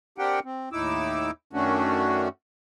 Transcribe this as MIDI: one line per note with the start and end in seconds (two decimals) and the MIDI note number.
0.18 0.40 60
0.18 0.40 62
0.18 0.40 67
0.18 0.40 70
0.18 0.40 78
0.18 0.40 79
0.45 0.69 60
0.73 1.31 39
0.73 1.31 45
0.73 1.31 63
0.73 1.31 64
0.73 1.31 86
0.73 1.31 88
1.53 2.28 42
1.53 2.28 51
1.53 2.28 57
1.53 2.28 61
1.53 2.28 62
1.53 2.28 66